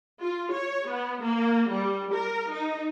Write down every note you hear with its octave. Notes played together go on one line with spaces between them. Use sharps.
F4
C#5
B3
A#3
G3
A#4
D#4